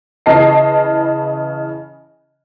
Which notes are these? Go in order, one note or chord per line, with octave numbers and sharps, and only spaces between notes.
C#3 E3 D#5 A5 C7